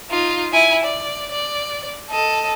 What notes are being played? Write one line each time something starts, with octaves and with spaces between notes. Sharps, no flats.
D#4 F4
E4 G#5
D5
D5
A4 D#5